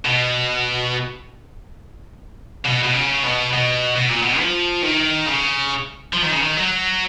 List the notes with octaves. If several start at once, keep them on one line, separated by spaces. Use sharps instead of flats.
B2
B2
B2
C#3
B2
B2
B2
A#2
B2
F3
D#3
C#3
F3
D#3
C#3
D#3
F#3